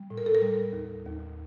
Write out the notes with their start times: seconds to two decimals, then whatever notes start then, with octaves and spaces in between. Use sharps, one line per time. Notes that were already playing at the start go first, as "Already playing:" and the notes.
Already playing: G3
0.10 A2
0.18 A#4
0.26 A4
0.35 A#4
0.42 G3
0.73 D#2
1.06 D#2